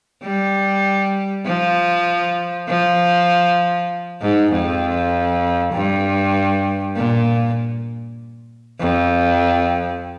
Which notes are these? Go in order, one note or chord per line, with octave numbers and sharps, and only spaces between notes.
G3
F3
F3
G#2
F2
G2
A#2
F2